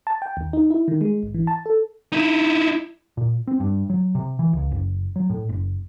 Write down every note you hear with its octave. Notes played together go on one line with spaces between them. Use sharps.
A5
G5
D#2
D#4
E4
D#3
G#3
G#1
E3
A5
A4
D#4 E4
A#2
C4
G2
F#3
C3
E3
C#2
F#1
F#3
A2
F#1